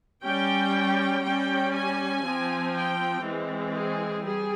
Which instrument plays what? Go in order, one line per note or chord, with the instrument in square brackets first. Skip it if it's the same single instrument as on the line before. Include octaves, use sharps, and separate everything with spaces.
[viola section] G3 C#4 G5
G3 C#4 G5
G#5
F3 C4
G5
E3 G#3 C4
G#4
G3 G#4